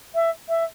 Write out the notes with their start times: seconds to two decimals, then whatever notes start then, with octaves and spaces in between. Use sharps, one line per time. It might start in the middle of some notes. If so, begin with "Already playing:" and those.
0.15 E5
0.49 E5